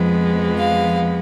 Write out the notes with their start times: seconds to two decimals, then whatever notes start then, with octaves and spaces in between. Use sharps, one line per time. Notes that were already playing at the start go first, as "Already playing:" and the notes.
Already playing: F2 F3 G#3 B3
0.57 F5